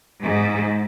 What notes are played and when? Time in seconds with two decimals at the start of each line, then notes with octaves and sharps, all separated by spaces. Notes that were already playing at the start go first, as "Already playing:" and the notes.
0.23 G#2